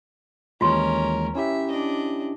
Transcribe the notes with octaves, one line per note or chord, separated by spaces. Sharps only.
D#2 E3 G#3 C#4 F4 A#4 C6
C#4 E4 G4 E5
D4 D#5